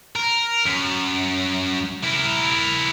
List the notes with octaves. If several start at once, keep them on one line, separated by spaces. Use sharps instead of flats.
A#4
F#2
E4 A#4